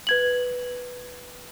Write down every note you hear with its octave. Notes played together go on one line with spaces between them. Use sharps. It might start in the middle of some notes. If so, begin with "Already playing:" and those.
B4 G#6 F#7